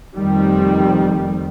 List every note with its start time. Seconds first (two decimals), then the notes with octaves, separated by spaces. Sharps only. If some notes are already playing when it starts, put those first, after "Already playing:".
0.16 F1 F2 D#3 G3